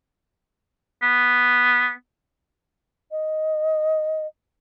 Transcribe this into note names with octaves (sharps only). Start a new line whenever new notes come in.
B3
D#5